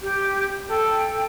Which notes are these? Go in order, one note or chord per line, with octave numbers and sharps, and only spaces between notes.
G4
A4 G5